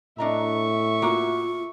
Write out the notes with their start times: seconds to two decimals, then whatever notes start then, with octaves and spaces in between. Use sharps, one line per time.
0.18 A2 D4 D#5 E5 A#5 C#6
1.02 A#3 F4 F#4